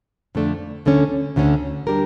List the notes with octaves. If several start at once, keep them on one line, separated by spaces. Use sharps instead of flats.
F2 D3 A3 D4
D2 D3 A3 C#4
D2 D3 A3 C#4
G3 D4 G4 A#4